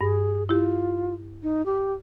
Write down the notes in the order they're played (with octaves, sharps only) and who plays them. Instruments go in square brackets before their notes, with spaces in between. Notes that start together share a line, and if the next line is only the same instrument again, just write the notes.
[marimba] G2 [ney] G#4
[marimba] E4 G4 [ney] F4
[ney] D#4
G4